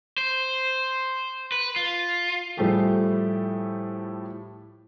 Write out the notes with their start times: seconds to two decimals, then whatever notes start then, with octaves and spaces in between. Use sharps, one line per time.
0.18 C5
1.52 B4
1.76 F4
2.57 A2 F3 G3 A3 G4 G#4